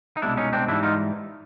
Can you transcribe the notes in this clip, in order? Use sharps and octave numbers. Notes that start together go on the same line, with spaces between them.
D#4
C2 B2 G#3 D4 E4
C#4 D#4
C4 D4
G#2 E3 G3 D4 E4
D#4 F4